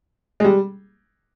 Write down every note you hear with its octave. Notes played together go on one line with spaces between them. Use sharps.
G#3
G3